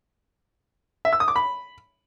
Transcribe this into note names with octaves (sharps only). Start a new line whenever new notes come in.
E5
E6
D#6
D6
B5